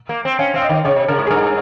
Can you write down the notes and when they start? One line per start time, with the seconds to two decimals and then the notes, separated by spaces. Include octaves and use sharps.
0.09 A#3
0.25 C4
0.39 C#4 F5
0.54 C4 F5
0.62 D#5
0.69 D#3
0.85 C#3 C#5
0.96 C3
1.08 C#3 A#4
1.19 G#2
1.27 G#4
1.30 G2 A#4